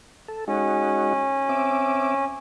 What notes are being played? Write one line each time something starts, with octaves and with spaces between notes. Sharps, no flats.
A4
G#3 C#4 D#4 F#4
C4 E5 D6